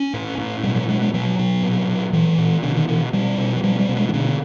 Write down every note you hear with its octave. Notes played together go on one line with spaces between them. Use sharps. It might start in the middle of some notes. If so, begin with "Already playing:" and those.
Already playing: C#4
A2
A2
B2 G3
F#3
B2 G#3
G#3
B2 F#3
B2
A#2
A#2
A#2 E3
A#2
B2 D3
D#3
B2 E3
B2 G3
B2
F#3
B2 G3
G3
B2
G#3
D#3
B2 D3